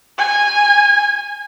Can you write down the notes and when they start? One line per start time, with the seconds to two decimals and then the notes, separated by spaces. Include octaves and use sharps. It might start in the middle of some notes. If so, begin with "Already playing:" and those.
0.18 G#5